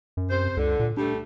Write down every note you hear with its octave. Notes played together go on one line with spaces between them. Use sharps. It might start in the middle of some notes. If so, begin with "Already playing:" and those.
F#2
C3 C5
C#2 D3
A#2
G3 A3 D4